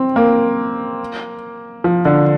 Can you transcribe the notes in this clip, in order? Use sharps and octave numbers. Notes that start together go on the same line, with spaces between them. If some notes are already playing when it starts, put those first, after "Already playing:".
Already playing: C4
A#3
F3
D3